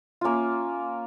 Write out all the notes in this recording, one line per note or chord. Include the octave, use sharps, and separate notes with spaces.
A#3 C#4 F4